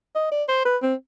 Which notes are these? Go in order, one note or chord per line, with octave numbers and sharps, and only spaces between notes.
D#5
D5
C5
B4
C4